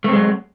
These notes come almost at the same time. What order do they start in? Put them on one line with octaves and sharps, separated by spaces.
A3 C4 G#3 F#3